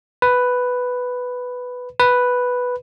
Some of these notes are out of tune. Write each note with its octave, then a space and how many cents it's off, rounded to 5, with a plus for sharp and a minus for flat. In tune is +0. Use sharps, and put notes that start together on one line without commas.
B4 +5
B4 +0